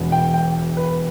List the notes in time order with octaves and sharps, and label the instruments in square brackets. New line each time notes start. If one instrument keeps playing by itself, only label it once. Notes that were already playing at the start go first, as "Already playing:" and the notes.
Already playing: [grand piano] E1 E2 B2
G5
G5
B4